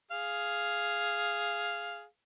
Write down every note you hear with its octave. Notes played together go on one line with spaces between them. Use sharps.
G#4 F5